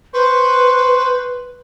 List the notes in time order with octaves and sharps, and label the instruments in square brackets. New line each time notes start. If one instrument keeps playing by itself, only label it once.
[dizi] B4 [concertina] C5 C#6